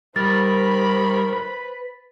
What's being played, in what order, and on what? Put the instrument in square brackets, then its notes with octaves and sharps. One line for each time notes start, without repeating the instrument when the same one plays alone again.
[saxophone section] D#3 A#4 [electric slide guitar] G3 [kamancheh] C5 B5 [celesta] A6
[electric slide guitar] B4